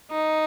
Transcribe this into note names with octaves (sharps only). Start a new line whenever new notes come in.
D#4